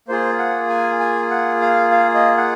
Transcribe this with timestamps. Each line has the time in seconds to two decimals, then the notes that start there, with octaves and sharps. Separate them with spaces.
0.08 A#3 F4 G#4 C5
0.38 F#5
0.69 G#5
1.00 G#5
1.31 F#5
1.61 F5
1.91 F5
2.14 D#5
2.37 F#5